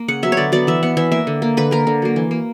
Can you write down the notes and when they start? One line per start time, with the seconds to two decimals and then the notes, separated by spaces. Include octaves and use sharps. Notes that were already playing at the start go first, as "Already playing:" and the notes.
Already playing: A#3
0.08 C#3 F#5
0.22 F#3 B3 E5
0.32 C#5
0.37 D3 D5
0.52 F#3 B3 D5
0.67 E3 E5
0.83 B3 F#5
0.97 E3 E5
1.12 A#3 E5
1.27 D3
1.42 A#3
1.57 D3 B4
1.71 A#3 A#4
1.87 D3
2.02 F#3 A#3
2.16 E3
2.31 A#3